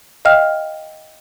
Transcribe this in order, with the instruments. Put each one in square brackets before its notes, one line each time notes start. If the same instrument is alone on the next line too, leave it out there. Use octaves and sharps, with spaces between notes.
[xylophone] D#5 F5 G5 F6